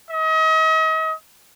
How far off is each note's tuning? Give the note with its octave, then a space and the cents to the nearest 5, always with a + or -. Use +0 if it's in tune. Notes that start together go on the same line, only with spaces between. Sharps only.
D#5 +40